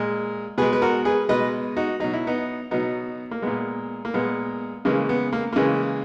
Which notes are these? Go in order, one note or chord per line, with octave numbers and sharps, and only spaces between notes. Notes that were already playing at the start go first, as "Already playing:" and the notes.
Already playing: A#2 G#3
B2 G#3 G#4 B4
B4
F#4 A#4
G#4 B4
B2 G#3 B4 D#5
D#4 F#4
B2 F#3 D#4
E4
B3 D#4
B2 F#3 B3 D#4
A#3
A#2 G#3 B3
A#3
A#2 G#3 B3
C#3 E3 G#3 A#3
B3
A#3
C#3 E3 G#3 A#3